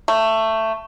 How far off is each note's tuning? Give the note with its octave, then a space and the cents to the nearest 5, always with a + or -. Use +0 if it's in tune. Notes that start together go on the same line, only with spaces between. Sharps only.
A3 +15